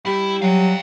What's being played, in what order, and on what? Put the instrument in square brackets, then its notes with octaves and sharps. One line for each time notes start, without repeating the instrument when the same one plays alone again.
[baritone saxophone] G3 [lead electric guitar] E4
[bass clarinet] F#3 [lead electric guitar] F5 G5